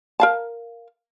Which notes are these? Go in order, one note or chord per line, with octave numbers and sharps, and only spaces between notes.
A#4 F5 A5